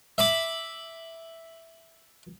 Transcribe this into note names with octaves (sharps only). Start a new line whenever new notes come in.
E5 B5 D6